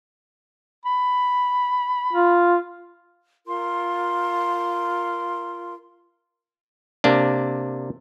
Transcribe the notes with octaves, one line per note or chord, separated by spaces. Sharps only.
B5
F4
F4 A#4 C6
C3 A#3 D4